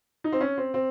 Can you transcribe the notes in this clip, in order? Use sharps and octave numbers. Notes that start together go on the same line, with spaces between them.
D#4
C4
C#4
C4
C4